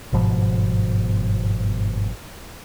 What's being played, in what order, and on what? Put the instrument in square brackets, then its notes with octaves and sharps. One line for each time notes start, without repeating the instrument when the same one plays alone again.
[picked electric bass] G1 G#2 B2 F3